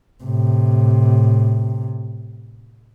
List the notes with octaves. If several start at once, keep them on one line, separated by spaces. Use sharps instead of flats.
A2 C3